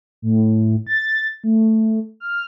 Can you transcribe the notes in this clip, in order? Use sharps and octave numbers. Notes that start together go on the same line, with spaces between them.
A2
A6
A3
F6